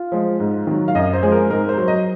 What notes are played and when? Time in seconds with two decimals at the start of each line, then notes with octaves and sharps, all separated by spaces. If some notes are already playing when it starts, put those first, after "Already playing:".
Already playing: F4
0.12 F3 G#3
0.40 G#2
0.67 D#3 F#3
0.88 F5
0.95 F#2 D#5
1.14 C5
1.22 F3 G#3 G#4
1.32 A#4
1.50 G#2 A#4
1.69 C5
1.77 F#3
1.88 D#5